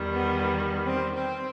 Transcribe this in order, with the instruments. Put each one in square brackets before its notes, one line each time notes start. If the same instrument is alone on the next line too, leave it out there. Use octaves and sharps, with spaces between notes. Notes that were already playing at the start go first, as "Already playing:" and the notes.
Already playing: [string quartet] E2 D#3 G3
B3
C4
C4